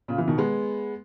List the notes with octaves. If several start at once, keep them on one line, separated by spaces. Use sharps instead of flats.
A#2 C#3
C#3 E3
B2 D#3
G#3 B3